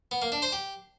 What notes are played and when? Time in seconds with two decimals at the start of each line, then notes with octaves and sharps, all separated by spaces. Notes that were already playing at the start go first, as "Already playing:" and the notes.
0.11 B3
0.22 A#3
0.32 D4
0.42 C5
0.52 G4